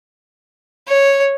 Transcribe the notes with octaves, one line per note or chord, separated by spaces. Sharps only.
C#5